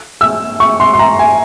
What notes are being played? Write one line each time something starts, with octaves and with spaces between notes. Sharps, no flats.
E6
C#6
C6
C6
A#5
G#5